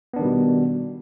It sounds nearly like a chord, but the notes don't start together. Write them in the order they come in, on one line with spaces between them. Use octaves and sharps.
B3 D4 D#3 G3 B2